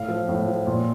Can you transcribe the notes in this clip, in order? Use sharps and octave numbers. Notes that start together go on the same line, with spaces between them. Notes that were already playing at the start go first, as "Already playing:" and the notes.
Already playing: A2 F5
F3
A2
F3
A#2